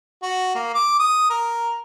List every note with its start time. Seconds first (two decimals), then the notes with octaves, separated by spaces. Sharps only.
0.22 F#4
0.55 A#3
0.74 D6
0.99 D#6
1.30 A#4